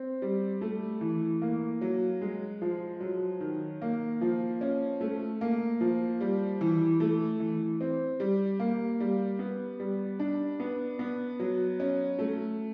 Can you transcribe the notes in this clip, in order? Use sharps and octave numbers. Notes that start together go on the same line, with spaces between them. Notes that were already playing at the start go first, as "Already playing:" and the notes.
Already playing: C4
G3
A3
E3
A#3
F#3
G#3
F3
F#3
D#3
A#3
F3
C#4
A3
A#3
F3
G3
E3
A3
E3
C4
G3
A#3
G3
B3
G3
D4
B3
B3
F#3
C#4
A3